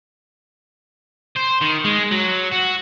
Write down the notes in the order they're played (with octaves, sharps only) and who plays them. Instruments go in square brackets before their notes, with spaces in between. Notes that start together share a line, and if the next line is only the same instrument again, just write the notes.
[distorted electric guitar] C5
D#3
G#3
F#3
F#4